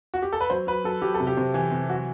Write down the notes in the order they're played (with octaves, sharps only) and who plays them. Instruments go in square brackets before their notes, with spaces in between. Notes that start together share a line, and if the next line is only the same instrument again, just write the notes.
[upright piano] F#4
G4
A4
B4
F#3 C5
F#3 B4
F#3 A4
F#3 G4
A4
C3
G4
C3
E3
C3
F#3 F#4